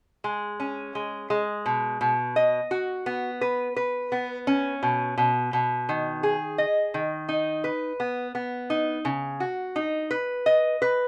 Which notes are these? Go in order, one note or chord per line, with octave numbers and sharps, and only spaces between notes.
G#3
C#4
G#3
G#3
B2
B2
D#5
F#4
B3
B4
B4
B3
C#4
B2
B2
B2
D#3
G#4
D#5
D#3
D#4
B4
B3
B3
D#4
C#3
F#4
D#4
B4
D#5
B4